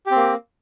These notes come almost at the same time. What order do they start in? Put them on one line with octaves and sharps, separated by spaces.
G4 C4 A#3